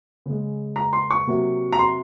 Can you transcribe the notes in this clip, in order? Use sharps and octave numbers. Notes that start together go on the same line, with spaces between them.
C#3 G#3
A#5
C6
C#6
C3 F#3 A#3
A#5
C6